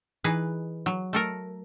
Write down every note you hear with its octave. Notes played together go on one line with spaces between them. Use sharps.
E3 D#4 G#4 B4
F#3
A3 A4 A#4